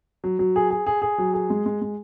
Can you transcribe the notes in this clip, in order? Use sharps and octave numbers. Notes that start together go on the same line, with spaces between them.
F#3
F#3
G#4
G#4
G#4
G#4
F#3
G#4
G#3
G#3
G#3